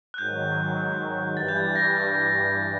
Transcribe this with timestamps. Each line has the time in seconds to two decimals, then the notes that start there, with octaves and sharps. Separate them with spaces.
0.14 F#6
0.18 G#2 D#3 F#3 G6
1.36 G2 E3 G3 A6
1.48 G6
1.56 G#6
1.76 A#6